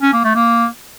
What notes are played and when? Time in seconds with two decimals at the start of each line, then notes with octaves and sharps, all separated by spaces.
0.02 C#4
0.13 A#3
0.24 A3
0.35 A#3